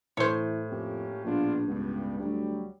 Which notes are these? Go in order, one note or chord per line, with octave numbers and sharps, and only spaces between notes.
A2 E3 C5 C#5
F2 A#3 C#4 G4
A#1 B3 D4 F4
C#2 G2 B3
D2 F#3 G3